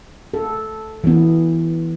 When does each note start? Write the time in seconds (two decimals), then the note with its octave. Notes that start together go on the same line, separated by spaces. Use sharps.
0.34 A4
1.04 E3 B3